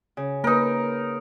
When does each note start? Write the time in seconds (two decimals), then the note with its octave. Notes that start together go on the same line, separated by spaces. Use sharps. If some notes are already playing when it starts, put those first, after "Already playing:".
0.17 C#3
0.44 A#3 D#4 A#4 B4